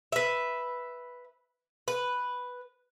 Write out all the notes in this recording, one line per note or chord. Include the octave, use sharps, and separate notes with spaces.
B4 E5
B4